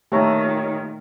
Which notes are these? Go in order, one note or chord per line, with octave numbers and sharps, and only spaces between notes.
A#2 D#3 A3 G4 C#5 A#5